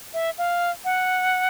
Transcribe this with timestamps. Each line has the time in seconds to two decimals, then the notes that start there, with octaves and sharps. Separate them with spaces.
0.14 E5
0.38 F5
0.85 F#5